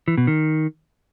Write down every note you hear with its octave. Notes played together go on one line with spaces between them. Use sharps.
E3
B2
D#3